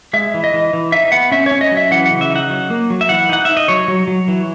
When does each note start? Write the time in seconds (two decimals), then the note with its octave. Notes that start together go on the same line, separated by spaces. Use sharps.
0.13 G#3 E5
0.34 E3
0.44 D#5
0.54 E3
0.73 E3
0.92 D#4 E5
1.12 B3 F#5
1.32 C#4 E5
1.46 C#5
1.51 C#4
1.61 D#5
1.72 F#3
1.77 E5
1.91 E3 F#5
2.06 F#5
2.11 C#3
2.21 E5
2.31 D#4 F#5
2.50 F#3
2.70 A#3
2.90 F#3
3.01 E5
3.09 E3 F#5
3.29 D#4 F#5
3.45 D#4 E5
3.57 D#5
3.68 F#3 C#5
3.88 F#3
4.08 F#3
4.28 E3